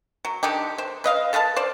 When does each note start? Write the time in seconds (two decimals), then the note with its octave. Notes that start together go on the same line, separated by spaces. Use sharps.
0.25 F#3
0.43 D3 D#4 G4
0.78 C5
1.04 B4 D#5 F5
1.33 A4 B4 F5 A5
1.56 C5 D5